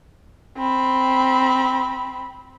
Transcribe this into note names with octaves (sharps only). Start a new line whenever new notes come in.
C4 B5